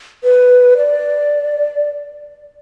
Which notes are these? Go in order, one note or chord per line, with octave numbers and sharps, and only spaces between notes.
B4
D5